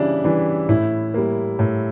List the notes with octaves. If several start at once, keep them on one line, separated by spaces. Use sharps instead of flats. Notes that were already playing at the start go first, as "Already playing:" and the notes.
Already playing: C#3 E3 G3 D4 E4
E3 G3 D4
A2 E4
G3 A#3
A2